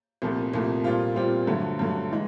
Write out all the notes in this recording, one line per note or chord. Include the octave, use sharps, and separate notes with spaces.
C2 A#2 F3 A3
C2 A#2 F3 A3
A#2 G3 C4 F4
A#2 G3 C4 F4
G2 D3 F#3 A3
G2 D3 F#3 A3
E3 G#3